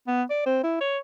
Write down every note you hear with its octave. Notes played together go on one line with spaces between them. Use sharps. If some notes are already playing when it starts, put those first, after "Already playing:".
B3
D5
C4
E4
C#5